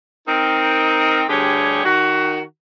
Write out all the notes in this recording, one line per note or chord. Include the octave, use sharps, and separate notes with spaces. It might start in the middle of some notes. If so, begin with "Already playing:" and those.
C4 D#4 A#4
D2 D3 G3 G4 G#4 C#5
D#3 F#4